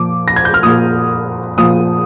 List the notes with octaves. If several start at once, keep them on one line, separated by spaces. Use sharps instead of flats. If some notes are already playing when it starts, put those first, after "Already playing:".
Already playing: A#2 F3 D6
A#6
G#6
G6
F6
A#2 F3 D#6
A#2 F3 D#6